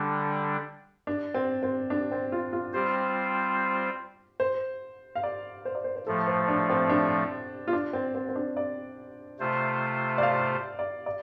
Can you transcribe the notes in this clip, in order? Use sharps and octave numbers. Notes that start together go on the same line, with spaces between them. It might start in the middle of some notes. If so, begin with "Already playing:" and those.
Already playing: D3 G3 D4
D4
C4
C4
D4
C4
F4
F4
G3 C4 F4 G4 C5
C5
F5
D5
C5
D5
C5
C5
A2 F3 A3 A4
C5
D4
C4
D4
F4
D4
C4
C4
C4
D4
D5
C3 A3 F4 C5
D5
F5
D5
D5